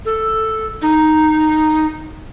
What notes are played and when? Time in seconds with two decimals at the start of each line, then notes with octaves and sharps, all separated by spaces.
0.05 A4
0.82 D#4